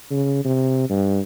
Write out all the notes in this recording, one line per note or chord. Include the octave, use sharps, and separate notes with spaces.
C#3
C3
G2